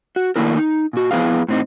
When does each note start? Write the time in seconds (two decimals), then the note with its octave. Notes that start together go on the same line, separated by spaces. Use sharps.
0.16 F#4
0.36 D#3 A3 A#3 D4 E4 A#4
0.57 D#4
0.93 A#2 F#4
1.11 F2 B3 E4 G#4 B4 F5
1.48 A2 C4 D#4